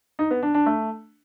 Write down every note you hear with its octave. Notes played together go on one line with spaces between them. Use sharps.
D#4
B3
D4
D4
A3